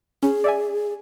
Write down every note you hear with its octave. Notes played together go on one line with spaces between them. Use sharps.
C#4 G#4
D5 E5 G#5